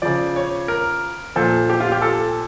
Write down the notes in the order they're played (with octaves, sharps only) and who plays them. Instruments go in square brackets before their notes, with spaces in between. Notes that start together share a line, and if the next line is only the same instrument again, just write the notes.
[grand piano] C#3 F3 D5
C#5
A#4
A#2 F3 A4
G4
F4
G4
A4